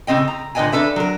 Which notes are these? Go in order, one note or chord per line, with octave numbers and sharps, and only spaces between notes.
A2 C#3 C4 D#5 G5
A#5
A#2 D3 B4 D#5 G5 G#5
D4 A4 B4 E5
F#3 A#4